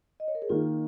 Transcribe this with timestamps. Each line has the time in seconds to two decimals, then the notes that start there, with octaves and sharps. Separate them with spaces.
0.20 D#5
0.28 C#5
0.35 A#4
0.42 G#4
0.49 D#3 A#3 D#4 F4